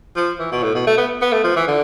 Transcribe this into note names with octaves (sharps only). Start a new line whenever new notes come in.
F3
E3
B2
A2
B2
A3
B3
B3
A3
F3
E3
D3